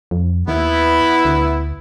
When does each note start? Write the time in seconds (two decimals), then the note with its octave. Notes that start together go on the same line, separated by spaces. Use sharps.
0.11 F2
0.48 D#2 B3 E4
1.25 D2